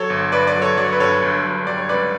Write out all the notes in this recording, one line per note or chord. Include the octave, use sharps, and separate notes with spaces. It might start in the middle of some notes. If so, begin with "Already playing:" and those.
Already playing: F#3 A4 C#5
G1
G1 B4 D5
B4 D5
F#3
A4 C#5
F#3 D5
C#5
B4
G2 A4 C#5
G1
F#3
G3 D5
C#5
C#2 B4 D5